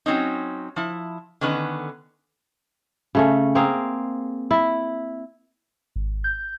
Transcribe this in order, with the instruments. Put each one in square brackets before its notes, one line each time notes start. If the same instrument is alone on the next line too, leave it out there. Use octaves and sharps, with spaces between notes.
[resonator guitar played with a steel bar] F#3 C4 C#4 D#4
F3 E4
D3 D#3 B3 C#4 B4
[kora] C#3 A3 C#4
A#3 C4 G#4 F5
E4
[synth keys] G#1
G6